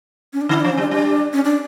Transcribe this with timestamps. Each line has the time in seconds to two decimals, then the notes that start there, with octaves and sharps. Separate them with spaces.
0.33 C#4
0.41 D4
0.49 D3 E4
0.60 D4
0.64 F3
0.71 C#4
0.77 G3
0.81 D4
0.91 G3 D4
1.33 C#4
1.44 D4